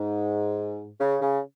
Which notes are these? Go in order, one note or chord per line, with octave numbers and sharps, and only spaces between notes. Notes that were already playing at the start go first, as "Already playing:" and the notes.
Already playing: G#2
C#3
C#3